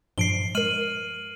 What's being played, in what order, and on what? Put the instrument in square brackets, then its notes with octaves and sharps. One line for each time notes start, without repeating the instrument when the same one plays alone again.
[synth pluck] G2 A#2 F3 [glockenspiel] C7 D7 G7
[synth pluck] G#3 A#4 [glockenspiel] F6 D#7 F#7